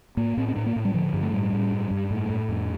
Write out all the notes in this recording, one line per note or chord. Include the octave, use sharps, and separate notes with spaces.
A2 A#3
A2 C4
C4
A2 D4
A#3
A2
G3
D3 F3
G2
A3
A2 G3
A2
G2
G2
A2 A3
A2
F2